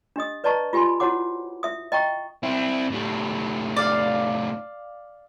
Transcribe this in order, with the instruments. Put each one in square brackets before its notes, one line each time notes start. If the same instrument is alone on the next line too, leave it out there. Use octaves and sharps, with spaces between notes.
[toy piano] D4 G4 D#5 D#6
B4 D5 D#5 A5 A#5 C#6
F4 G4 G#5 B5 C6
E4 F#4 C5 C#5 F#5 D6
E5 D#6
D#5 G5 A#5 C#6
[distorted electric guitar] C4 E4
A2 G3
[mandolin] D5 F5